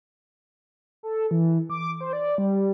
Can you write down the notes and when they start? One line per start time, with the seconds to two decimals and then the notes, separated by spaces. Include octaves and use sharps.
1.03 A4
1.31 E3
1.70 D6
2.01 C5
2.13 D5
2.38 G3